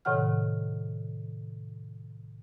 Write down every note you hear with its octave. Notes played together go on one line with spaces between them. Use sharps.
A2 C3 D#3 C#5 F#5 F6